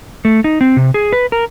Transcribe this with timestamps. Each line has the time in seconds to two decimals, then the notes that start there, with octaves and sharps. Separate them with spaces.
0.25 A3
0.44 D#4
0.61 C4
0.77 C3
0.94 G#4
1.13 B4
1.32 A#4